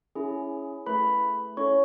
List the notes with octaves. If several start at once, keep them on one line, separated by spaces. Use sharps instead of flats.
C#4 E4 G#4
A3 E4 G#4 B4 B5
C#4 E4 A4 C#5 C#6